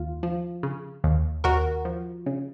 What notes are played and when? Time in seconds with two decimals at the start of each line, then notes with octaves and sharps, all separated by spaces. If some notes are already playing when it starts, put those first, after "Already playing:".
Already playing: D#2 F4
0.23 F3
0.63 C#3
1.04 D#2
1.44 D#2 F#4 A#4
1.85 F3
2.26 C#3